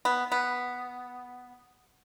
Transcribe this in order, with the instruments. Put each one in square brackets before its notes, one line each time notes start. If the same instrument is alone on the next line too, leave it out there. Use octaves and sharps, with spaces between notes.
[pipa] B3
B3